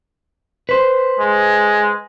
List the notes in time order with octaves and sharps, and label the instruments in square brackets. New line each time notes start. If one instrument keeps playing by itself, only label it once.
[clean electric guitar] B4 C5
[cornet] G#3